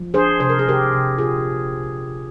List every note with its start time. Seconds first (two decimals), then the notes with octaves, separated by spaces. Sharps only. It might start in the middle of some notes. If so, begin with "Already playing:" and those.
Already playing: F3
0.14 D4 G#4 C5
0.40 C3 C5
0.49 A#4
0.59 G#4
0.67 C3 G4 A#4
0.93 C3
1.18 A#2 F4 G#4